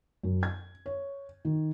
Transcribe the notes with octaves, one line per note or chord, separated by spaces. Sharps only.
F#2
G#6
C#5
D#3